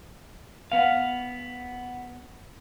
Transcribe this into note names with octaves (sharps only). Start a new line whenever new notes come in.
B3 F5